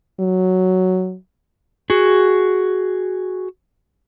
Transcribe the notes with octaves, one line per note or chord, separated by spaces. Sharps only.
F#3
F#4 G#4